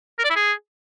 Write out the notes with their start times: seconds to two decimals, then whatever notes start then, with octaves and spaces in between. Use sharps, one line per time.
0.19 A#4
0.24 D5
0.30 E4
0.36 G#4